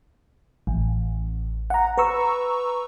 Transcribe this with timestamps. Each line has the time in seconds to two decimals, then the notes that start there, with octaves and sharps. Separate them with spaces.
0.67 A1
1.70 F#5 A#5
1.97 B4 A#5 C#6 E6